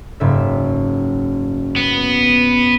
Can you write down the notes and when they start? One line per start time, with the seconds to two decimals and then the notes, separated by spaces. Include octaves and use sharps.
0.20 F#1 G#2 E5
1.76 B3